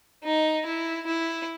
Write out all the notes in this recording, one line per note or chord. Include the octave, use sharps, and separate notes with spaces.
D#4
E4
E4